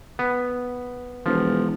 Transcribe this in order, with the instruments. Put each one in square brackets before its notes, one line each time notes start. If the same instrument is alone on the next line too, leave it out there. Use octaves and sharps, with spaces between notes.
[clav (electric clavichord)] B3
[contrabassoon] E1 [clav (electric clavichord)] F3